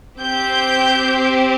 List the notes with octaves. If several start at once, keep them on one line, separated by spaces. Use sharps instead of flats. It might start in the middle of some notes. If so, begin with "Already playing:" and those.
C4 G4 G6